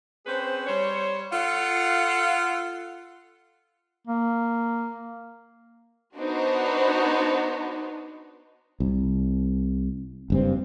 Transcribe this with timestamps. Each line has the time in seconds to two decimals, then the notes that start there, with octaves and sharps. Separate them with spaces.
0.27 C4 C#4 G#4 B4 C5
0.67 G3 C5 C#5
1.32 F4 A4 F5 F#5
4.08 A#3
6.18 B3 D4 D#4 F#4 C5
8.80 C2
10.30 F#1 G2 C4